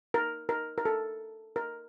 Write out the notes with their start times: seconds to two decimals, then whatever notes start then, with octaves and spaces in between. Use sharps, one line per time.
0.14 A#4
0.49 A#4
0.78 A#4
0.85 A4
1.56 A#4